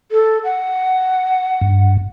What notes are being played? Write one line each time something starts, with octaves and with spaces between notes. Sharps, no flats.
A4
F#5
G2